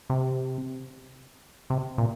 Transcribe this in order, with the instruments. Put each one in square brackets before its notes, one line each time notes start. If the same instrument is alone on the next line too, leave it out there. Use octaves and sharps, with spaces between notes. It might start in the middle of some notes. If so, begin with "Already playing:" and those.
[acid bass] C3
C3
A#2